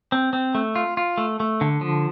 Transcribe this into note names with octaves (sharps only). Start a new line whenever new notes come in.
C4
C4
A3
F4
F4
A3
A3
D3
F3